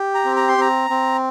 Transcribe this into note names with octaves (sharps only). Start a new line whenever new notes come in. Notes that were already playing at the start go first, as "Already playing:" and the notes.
Already playing: G4
A#5
C4
A#5
C6
C4 A#5
C4